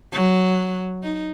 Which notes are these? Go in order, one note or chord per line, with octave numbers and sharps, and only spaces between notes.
F#3
D#4